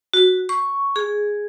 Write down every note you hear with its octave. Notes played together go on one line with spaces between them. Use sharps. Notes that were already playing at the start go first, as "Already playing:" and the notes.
F#4
C#6
G#4